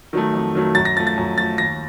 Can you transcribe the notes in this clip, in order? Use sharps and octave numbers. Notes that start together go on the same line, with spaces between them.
D#3 F#3 A3
F2
D#3 F#3 A3
F#2 A6
A#6
F3 A3 A6
A6
F#2
F3 A3 A6
D#2 A#6